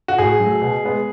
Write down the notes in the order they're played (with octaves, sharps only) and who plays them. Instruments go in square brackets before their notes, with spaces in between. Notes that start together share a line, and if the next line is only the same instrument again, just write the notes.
[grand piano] F#4
A2 G#4
F#3 A3
B2
G#3 B3